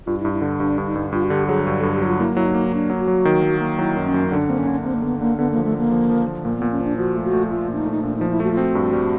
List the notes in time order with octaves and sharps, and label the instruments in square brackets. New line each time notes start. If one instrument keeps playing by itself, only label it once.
[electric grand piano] G2 [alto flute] F4
[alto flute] E4
[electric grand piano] G2
[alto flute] E4
[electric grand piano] D3
[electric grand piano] G2 [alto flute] D4
[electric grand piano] G2
[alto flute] D#4
[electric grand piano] G2
[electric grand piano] G2 [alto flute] F4
[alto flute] F#4
[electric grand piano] D3 [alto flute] G4
[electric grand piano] F#3 [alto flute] G#4
[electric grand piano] G2
[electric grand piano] G2 [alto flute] A4
[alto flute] G4
[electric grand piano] F#3 [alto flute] F4
[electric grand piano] A#3 [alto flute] E4
[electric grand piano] F#3 [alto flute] E4
[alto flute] D#4
[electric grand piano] A#3
[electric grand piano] F#3 [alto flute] D4
[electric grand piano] F#3
[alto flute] F#4
[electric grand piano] F#3
D#3
F#3
A#3
[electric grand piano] F#3 [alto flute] E4
[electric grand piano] F#2
[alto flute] C#4
[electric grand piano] F#2
[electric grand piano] D3 [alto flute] D4
[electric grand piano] A#3 [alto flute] C4
[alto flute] C#4
[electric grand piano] D3
[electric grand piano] D3 [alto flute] C4
[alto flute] A#3
[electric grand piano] D3 [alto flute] B3
[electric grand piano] D3 [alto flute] A#3
[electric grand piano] D3 [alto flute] B3
[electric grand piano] F3 [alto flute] A#3
[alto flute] A3
[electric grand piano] D3
[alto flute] A#3
[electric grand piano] F3
F3
F3
[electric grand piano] A#2 [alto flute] A#3
[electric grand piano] A#2 [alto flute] B3
[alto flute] C#4
[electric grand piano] F3 [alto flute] D4
[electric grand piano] F3 [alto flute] F#4
[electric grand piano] A3
[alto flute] F#4
[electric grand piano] A3
[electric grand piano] A3 [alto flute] F4
[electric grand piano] A#2 [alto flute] D4
[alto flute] D#4
[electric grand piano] A3
[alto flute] D#4
[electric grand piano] A#2 [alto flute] D4
[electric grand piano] F3 [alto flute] D#4
[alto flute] E4
[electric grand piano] A3 [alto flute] F#4
[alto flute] F4
[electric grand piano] C4 [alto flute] F#4
[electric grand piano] G2
G3